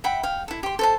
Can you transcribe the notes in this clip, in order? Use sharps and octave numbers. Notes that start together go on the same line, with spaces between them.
E5 F#5 G5 B5
F5 G5
E4 A4
G4 C6
A4 C5 A5